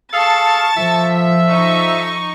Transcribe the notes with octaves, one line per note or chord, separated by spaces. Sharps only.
G#4 A4 F5 A5 C#6 A6
F3 A4 E5
D#4 C#6